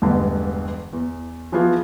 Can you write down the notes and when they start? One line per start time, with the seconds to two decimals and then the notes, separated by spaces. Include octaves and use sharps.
0.02 E1 A1 G2 D3
0.93 E2
1.52 E3 F3 B3 F4 F#4 G#4